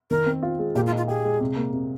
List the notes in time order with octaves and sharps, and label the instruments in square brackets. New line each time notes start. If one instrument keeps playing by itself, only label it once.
[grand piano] D#3 [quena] A#4
[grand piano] C4
F4
G#3
[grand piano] A#2 [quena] G4
[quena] F4
[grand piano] D#4
[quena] F4
[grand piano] G4 [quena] G#4
[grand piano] G#3
C3
A#3
C3